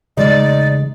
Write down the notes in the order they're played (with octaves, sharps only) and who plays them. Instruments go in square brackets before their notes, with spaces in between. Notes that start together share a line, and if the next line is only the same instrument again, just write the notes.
[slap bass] C#3 E3 A3 [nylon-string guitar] G#3 [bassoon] D#4 [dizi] D5